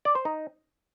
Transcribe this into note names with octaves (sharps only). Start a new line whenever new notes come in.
D5
C5
D#4